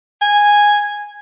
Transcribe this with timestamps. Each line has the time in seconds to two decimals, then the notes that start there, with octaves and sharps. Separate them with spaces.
0.22 G#5